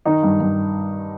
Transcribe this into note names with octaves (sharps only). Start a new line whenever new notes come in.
D#3 D#4
G2
G2